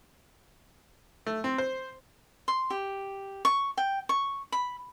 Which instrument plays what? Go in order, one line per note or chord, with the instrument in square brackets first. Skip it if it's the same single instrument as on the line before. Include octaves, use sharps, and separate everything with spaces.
[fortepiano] A3
C4
C5
[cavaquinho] C6
G4
C#6
G5
C#6
B5